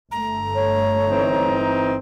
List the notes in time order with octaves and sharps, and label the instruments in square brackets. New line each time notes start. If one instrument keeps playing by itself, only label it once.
[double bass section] G1 A3 [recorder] A#5
[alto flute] C#5
[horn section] E3 C4 D#4